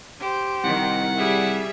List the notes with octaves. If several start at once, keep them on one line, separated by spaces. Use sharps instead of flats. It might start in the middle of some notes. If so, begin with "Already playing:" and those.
G4 C5
C2 D#3 F#5
G3 G#4 E5